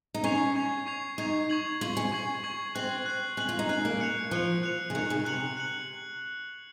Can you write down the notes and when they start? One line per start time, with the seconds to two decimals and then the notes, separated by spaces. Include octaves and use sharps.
0.14 D#4
0.24 C#4 C#6 G#6 C7 F7
0.56 C#6 G#6 C7 F7
0.86 C#6 G#6 C7 F7
1.18 D#4 C#6 G#6 C7 F7
1.50 C#6 G#6 C7 F#7
1.81 F4 C#6 G#6 C7 F#7
1.97 C#4
2.12 C#6 G#6 C7 F#7
2.43 C#6 G#6 C7 F#7
2.75 C4 F#6 C7 F#7
3.06 F#6 C7 F#7
3.37 C#4 F#6 C7 F#7
3.49 F4
3.59 D#4
3.69 C#4 F#6 C7 F#7
3.85 A#3
4.00 F#6 C#7 F7
4.31 F3 F#6 C#7 F7
4.63 F#6 C#7 F7
4.90 C#3
4.95 D#3 F#6 C#7 F7
5.10 C#3
5.25 C3 F#6 C#7 F#7
5.57 F#6 C#7 F#7